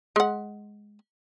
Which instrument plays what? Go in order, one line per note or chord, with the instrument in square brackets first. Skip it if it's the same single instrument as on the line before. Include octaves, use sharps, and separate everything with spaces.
[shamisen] G#3 F#5